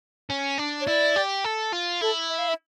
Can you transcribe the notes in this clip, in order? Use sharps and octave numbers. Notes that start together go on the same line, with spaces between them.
C#4
D4
C#5
E4 D5
G4
A4
F4
E4 A4
E5
F5
E5